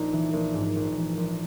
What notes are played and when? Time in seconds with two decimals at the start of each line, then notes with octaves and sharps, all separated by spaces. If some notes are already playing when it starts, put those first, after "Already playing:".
Already playing: A#1 D#4
0.13 E3
0.33 A#1
0.54 G#2
0.76 A#1
0.96 E3
1.17 A#1